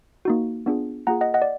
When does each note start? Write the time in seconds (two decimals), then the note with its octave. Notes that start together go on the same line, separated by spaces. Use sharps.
0.25 A#3 D#4 F#4
0.66 B3 D4 F4 G#4
1.07 A#3 F4 G#4 F#5 A#5
1.21 D#5 F#5
1.34 D#5 F#5
1.42 D5